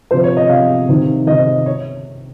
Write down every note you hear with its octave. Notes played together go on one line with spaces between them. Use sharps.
C3 F3 C5
C#5
D#5
C3 F3 F5
C3 D#3
C3 D#3 D#5
C#5